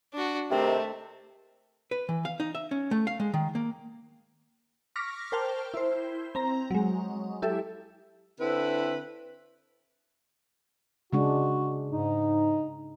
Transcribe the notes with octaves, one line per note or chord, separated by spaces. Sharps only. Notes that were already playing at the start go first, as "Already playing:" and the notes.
D4 F#4
C3 D#3 A3 C4
B4
E3
F5
D#4
E5
C#4
A3
F5
G#3
D#3
A#3
C#6 D6 F6 A#6 B6
A#4 C5 G5 A5 F6
E4 C5
C4 A#5
F#3 G#3
E4 G4 A4 E5
D3 C4 E4 B4
C#3 G#3 D4 F#4
G#2 D#4